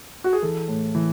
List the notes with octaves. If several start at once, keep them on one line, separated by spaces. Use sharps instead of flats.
F#4
G#4
E3 A4
A2
E3